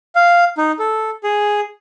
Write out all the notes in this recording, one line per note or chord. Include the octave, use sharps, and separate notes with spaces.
F5
D#4
A4
G#4